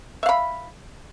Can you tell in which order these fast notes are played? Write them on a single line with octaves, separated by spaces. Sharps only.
E5 F5 B5